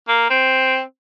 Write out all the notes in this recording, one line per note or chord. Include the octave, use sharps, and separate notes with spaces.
A#3
C4